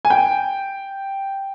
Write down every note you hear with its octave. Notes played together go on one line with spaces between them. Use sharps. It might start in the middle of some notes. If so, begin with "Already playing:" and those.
G#5
G5